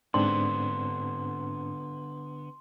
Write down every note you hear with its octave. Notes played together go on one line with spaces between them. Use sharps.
G#2 D3 B3 C4 D4 C6